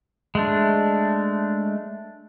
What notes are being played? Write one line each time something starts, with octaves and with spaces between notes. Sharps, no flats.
G#3 A3 D4